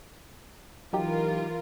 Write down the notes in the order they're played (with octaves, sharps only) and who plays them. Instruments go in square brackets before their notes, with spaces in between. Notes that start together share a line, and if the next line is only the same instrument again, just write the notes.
[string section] E3 F4 A#4 [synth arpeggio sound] F#3 D#4 G4